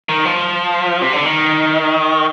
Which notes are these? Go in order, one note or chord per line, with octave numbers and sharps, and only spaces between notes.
D#3
F3
C3
D3
D#3